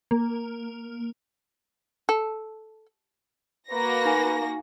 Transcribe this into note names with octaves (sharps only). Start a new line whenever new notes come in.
A#3
A4
A#3 F#4 B4 A#6
D#4 G#5